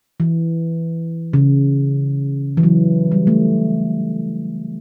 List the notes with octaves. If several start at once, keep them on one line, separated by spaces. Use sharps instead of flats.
E3
C#3
E3
F#3
G3
A3